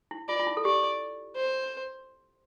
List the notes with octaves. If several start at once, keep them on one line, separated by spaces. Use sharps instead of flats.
E4
F4 D5
F4
E4
A4
G4 D5
C5